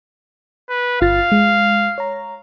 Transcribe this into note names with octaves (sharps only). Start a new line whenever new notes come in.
B4
G1 F4 F5 A6
G#3
C#5 A#5